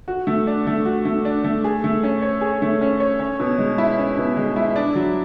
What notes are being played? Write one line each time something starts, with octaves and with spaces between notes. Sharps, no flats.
F#4
A3
D4
A3
F#4
A3
D4
A3
G#4
A3
C#4
C#5
G#4
A3
C#4
C#5
C#4
B2
G#3
E4
C#4
B2
G#3
E4
D4
F#3